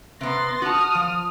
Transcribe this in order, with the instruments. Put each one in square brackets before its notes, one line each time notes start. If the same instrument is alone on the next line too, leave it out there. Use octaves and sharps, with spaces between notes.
[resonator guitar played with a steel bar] C3 B3 [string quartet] C6 A6 A#6
[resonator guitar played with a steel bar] F#4 A5 [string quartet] D#6 F6
[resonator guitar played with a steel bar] F3